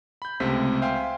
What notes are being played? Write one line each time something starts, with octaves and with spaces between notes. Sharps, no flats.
B5 G6
C#2 C3 A3 C5 B6
C5 E5 F5 G5 G#5 C6